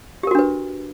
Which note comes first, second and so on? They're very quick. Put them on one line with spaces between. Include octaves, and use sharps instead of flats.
G4 A#4 F#4 D4 B4